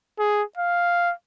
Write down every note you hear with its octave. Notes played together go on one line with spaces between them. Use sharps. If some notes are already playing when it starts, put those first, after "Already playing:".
G#4
F5